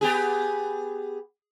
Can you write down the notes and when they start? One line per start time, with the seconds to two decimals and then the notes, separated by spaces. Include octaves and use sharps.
0.01 B3 G4 G#4